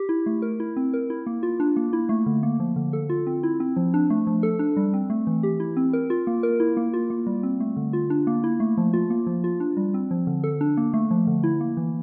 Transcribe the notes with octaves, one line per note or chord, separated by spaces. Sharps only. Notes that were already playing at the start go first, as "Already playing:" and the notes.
Already playing: G4
E4
A3
A#4
E4
C4
A#4
E4
A#3
F4
D4
A#3
E4
A3
D3
A#3
F3
D3
A4
F4
C4
E4
C4
F3
D4
A3
F3
A4
D4
G3
C4
A3
E3
G4
E4
C4
A#4
F4
A#3
A#4
E4
A#3
F4
A#3
G3
C4
A3
D3
F4
D4
A#3
E4
A3
F3
F4
A#3
F3
F4
D4
G3
C4
F3
D3
A4
D4
A#3
A3
F3
D3
E4
A#3
E3